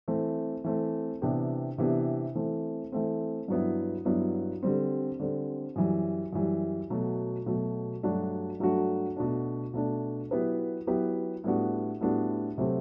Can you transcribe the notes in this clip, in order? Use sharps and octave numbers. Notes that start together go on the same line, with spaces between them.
E3 A3 C4
E3 A3 C4
C3 E3 B3 D4 G4
C3 E3 B3 D4 G4
E3 A3 C4
E3 A3 C4
G2 F#3 B3 E4
G2 F#3 B3 E4
D3 G3 C4
D3 G3 C4
F#2 E3 G3
F#2 E3 G3
B2 F#3 A3
B2 F#3 A3
G2 F#3 A3 D4 F#4
G2 F#3 A3 D4 F#4
B2 A3 D4
B2 A3 D4
F#3 B3 E4 G4 B4
F#3 B3 E4 G4 B4
A2 G3 B3 D4 F#4
A2 G3 B3 D4 F#4
C3 F#3 A3 C4 F#4